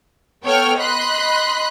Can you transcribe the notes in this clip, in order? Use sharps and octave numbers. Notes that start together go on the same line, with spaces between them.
B3 A4 C#5 G5 F6
D#5 B5 C6 F#6